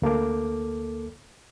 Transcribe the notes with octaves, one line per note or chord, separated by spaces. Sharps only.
D2 A#3 A4 D6